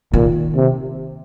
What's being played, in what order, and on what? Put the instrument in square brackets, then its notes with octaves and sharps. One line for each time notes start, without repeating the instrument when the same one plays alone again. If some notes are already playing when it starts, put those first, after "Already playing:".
[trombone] A#2 [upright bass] D#3
[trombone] C3